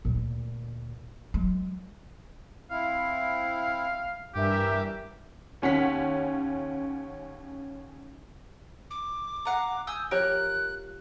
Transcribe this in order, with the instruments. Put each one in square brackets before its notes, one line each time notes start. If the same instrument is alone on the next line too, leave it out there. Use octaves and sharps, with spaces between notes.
[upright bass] D2 A#2
F#3 G#3
[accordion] C4 E4 [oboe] F5
[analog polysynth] G2 A#4 E5 [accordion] E3 [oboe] G4
[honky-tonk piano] D#2 C#4 F#5 B6
[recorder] D6
[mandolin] F5 F#5 A#5
[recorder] G#5 [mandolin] D#6 E6 G6
[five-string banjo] F3 G4 C#5 [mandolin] A#4 [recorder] F#6